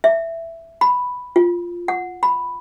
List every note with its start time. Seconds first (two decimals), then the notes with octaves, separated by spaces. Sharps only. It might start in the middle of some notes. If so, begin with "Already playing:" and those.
0.04 E5
0.81 B5
1.36 F4
1.88 F#5
2.23 B5